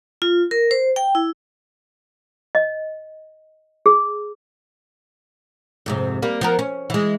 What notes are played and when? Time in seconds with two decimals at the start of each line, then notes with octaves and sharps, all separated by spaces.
0.22 F4
0.51 A#4
0.71 C5
0.96 G5
1.15 E4
2.55 D#5
3.86 G#4
5.86 F2 G#2 C3
6.22 G3 A#3
6.41 F3 B3 A#4
6.59 C#4
6.90 E3 G#3